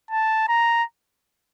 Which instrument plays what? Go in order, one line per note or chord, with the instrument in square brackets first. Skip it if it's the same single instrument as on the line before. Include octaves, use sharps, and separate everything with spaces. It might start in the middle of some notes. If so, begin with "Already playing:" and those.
[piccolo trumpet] A5
A#5